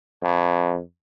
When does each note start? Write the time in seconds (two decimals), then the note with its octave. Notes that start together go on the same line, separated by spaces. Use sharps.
0.22 F2